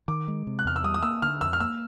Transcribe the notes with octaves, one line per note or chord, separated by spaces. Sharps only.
D#3 D6
G#3
C3
F#6
E2 F6
E6
G3 D#6
D#6
A#3 E6
D3 F6
F2 E6
F6
A#3 E6